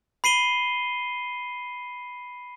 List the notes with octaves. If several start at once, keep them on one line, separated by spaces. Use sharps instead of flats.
B5 C7 D#7 G7